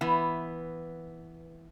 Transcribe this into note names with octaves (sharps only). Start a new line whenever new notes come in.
E3 B3